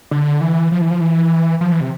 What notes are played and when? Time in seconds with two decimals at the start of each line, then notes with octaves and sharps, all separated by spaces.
0.11 D3
0.41 E3
0.72 F3
0.81 E3
0.91 F3
1.01 E3
1.61 F3
1.72 E3
1.81 C3